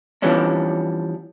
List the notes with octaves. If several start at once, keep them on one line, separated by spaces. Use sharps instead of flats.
E3 F3 G3 B3 C#4 D4